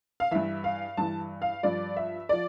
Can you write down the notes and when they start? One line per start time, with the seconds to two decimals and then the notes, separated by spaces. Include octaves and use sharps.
0.20 F5
0.31 G2 E3 E5
0.64 F5
0.97 G2 E3 A5
1.42 F5
1.63 G2 F3 D5
1.97 E5
2.29 F3 D5